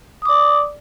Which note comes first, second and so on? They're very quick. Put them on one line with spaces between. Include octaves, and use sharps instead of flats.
D#6 D6 D5